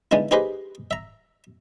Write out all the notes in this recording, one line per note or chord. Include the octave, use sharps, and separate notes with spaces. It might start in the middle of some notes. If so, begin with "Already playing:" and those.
D3 G#3 B3 D#4 E4
D#4 G4 G#4 B4 C5 D#5
E5 A#5